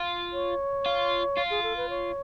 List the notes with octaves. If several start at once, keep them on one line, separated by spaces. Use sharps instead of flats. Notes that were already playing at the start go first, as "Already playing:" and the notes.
Already playing: F4
C#5
F4
F4
G#4
A4
B4
C#5